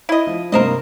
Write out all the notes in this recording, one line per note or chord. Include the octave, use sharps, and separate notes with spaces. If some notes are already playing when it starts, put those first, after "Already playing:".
E4 D#5
F3
G2 C3 A#3 A#4 C5 D#5